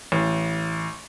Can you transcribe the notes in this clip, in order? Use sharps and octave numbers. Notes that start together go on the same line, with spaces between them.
A1